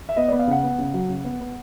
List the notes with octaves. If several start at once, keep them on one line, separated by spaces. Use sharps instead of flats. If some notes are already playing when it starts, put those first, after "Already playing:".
E5
B3 D#5
B3 D5
F5
C#3 F#5
B3
C#3
F#3
C#3
B3
B3